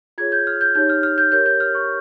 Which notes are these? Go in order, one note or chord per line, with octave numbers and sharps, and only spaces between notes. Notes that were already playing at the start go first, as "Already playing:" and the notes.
F4 G#4 C#5 G#6
G6
F6
G6
D#4 G4 C#5 G6
F6
F6
G6
G4 A#4 C#5 G6
G6
F6
C#6